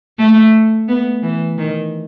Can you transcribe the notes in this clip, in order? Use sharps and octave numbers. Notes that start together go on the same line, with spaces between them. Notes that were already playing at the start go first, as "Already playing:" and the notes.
A3
B3
E3
D#3